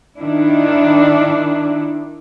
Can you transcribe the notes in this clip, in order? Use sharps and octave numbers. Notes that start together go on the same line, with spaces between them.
D#3 D4 E4